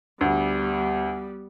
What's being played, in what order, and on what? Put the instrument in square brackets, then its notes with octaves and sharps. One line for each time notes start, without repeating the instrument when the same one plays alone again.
[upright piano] D2 [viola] G3 B3